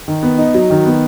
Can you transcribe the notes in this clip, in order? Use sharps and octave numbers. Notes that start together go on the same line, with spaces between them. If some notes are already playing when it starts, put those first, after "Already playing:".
D#3
B3
D#4
F#3
D#3
B3